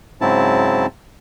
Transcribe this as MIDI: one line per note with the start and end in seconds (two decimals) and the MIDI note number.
0.21 0.86 44
0.21 0.86 49
0.21 0.86 54
0.21 0.86 60
0.21 0.86 64
0.21 0.86 81